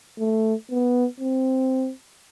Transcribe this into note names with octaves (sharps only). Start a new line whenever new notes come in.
A3
B3
C4